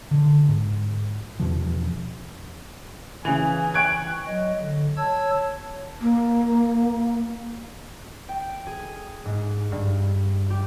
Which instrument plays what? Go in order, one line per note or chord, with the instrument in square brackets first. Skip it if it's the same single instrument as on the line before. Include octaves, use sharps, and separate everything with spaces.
[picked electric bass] D3
G#2
E2 B2 F3
[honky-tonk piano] C#3 F7 [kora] E3 [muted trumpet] G#5
[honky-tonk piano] G5 C#6 F#6 [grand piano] G#6 D7
[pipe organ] F#3 D#5
D3
C#5 A5 E6 G#6
[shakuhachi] A#3
[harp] G5
G#4
G#2
G2
G4